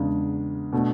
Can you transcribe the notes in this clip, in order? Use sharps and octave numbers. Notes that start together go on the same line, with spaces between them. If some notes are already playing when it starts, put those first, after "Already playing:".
Already playing: E2 C#3 G#3 D4
B2 A3 D4